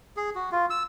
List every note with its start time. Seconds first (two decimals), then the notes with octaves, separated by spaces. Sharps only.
0.17 G#4
0.35 F#4
0.52 F4
0.70 E6